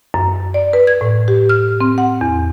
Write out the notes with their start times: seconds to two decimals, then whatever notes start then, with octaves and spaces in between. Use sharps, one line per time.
0.14 F#2
0.54 D5
0.73 B4
0.87 G#6
1.01 A2
1.28 G4
1.49 F6
1.81 C4
1.98 F#5
2.21 E2